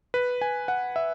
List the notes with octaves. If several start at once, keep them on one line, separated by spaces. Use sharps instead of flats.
B4
G#5
F#5
E5